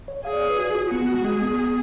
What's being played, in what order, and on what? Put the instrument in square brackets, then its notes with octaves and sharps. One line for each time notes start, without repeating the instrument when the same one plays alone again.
[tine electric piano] C#5
[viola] G#4 [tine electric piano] F5
[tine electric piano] D5
C#5
B4
F#4
F4
[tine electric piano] B3 [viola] F#4
[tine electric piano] B3
G#3
[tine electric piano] G#3 [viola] G#4
[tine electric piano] B3